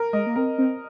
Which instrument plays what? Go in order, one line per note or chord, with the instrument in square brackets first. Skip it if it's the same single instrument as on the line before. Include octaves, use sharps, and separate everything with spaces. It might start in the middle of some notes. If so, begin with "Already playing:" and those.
Already playing: [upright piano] A#4
[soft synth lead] G#3 [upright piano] D#5
[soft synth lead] A#3
[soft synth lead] C4 [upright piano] A#4
[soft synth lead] C4